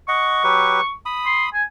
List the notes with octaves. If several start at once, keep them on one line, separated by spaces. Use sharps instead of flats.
D#5 F#5 C#6
F#3 G4 B4
B5 D#6
C6
G#5